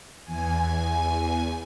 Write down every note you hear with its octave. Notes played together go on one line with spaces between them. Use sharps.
E2 G#5